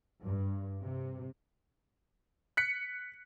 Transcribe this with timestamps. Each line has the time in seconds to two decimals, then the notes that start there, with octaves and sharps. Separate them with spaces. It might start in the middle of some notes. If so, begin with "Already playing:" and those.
0.22 G2
0.82 C3
2.57 F#6 B6 C#7